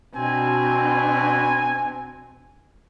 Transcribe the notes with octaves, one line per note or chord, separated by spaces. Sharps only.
B2 C4 D4 G#5